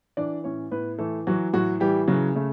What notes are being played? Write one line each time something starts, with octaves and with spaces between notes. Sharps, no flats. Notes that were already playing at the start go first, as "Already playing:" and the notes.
E3 D4 D5
A2 C#4 C#5
A2 B3 B4
E3 A3 A4
E3 F#3 F#4
A2 F#3 F#4
E3 G3 G4
C#3 F#3 F#4
C#3 A3